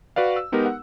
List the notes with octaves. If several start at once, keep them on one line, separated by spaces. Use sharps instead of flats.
F#4 B4 D5 F5
E6
G#3 B3 D#4 G4 A#4
F#5